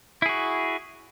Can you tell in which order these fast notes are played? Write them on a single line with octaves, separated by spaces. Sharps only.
E4 G#4 F#4